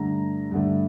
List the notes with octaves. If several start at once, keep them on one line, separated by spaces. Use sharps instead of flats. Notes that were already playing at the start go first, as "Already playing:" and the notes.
Already playing: G2 D3 A3 A#5
G2 D3 A3